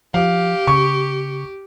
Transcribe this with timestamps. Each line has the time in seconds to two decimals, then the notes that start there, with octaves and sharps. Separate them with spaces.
0.14 F3 G4 F5
0.67 C#3 C#6